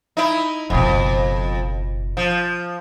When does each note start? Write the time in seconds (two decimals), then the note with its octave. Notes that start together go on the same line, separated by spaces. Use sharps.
0.17 D#4 E4
0.70 F#1 F2 B2
2.17 F3